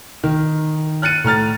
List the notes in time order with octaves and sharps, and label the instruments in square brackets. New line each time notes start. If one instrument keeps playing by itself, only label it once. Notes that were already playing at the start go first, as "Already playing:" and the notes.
[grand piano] D#3
F6 F#6 A6 C#7 D#7
A2 A#5 F6 A6